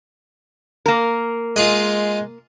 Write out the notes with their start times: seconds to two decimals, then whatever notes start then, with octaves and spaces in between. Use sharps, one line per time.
0.86 A#3 A#4
1.56 G#3 F4 G#4 D#5